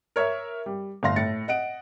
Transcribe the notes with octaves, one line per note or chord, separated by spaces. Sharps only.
A#4 C#5 E5
G3
G1 A2 F5 C6 A#6
A2 A6 C#7
D#5 F#5 D7